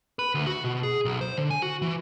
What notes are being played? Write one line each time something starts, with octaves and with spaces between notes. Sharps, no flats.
B4
D2
F#4
B2
G#4
B1
C5
D3
G#5
F#4
E3